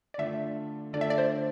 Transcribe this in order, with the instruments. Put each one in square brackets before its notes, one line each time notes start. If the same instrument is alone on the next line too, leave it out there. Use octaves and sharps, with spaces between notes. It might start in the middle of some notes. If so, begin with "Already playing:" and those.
[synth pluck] D5
[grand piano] D3 A3 D4 F4 A4 [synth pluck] E5
[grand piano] D3 A3 D4 F4 A4 [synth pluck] D5
[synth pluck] E5
D5
C5